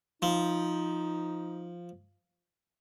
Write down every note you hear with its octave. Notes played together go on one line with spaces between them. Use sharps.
F3 D#4